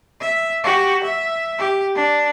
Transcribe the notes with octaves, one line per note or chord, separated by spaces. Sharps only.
E5
F#4 G4
E5
G4
D4